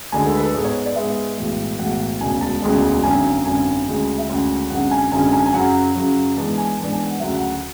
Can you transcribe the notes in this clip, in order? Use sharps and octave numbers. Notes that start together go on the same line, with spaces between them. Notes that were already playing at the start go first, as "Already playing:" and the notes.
D2 D3 G#3 G#5
A4
B4
A4
G#2 G#3 B3
C#5
D5
G#2 G#3 B3 E5
B1 A2 E3 G#3
B1 A2 E3 G#3 F#5
E1 D2 C#3 G#3 G#5
A5
E1 D2 C#3 G#3
G#1 F#2 D3 G#5
G#1 F#2 D3 G#5
D2 C#3 G#3 C#4
E5
D2 C#3 G#3 C#4 F#5
G#1 F#2 D3 G#3 F#5
G#5
G#1 F#2 D3 G#3 G#5
G#5
G#5
F#2 C#3 F#3 F#5
F#2 C#3 F#3
G#2 E3 G#3 B3 D4 A5
G#5
G#2 E3 G#3 B3 D4 A5
G#5
F#5
D2 C#3 F#3 E5
F#5